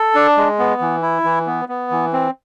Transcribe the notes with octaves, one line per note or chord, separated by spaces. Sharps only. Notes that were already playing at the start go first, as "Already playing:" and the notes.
Already playing: A4
D4
G#3
B3
E3
E4
E3
B3
B3
E3
C4